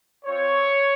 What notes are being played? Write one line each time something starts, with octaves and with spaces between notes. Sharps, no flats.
C4 F4 C#5